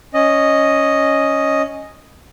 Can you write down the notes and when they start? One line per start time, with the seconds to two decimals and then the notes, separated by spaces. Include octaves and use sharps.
0.14 C#4 D#5